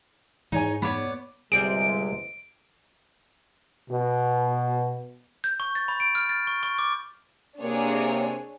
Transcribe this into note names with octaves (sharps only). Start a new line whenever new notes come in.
G#2 D#4 C#5 G#5
B3 C#5 D5 B5
G1 C3 G3 G#3 C4 G#4 D7
B2
G6
C#6
A6
B5
D7
F6
A6
C#6
C#6
D6
C3 A#3 C4 D4 G#4 C#5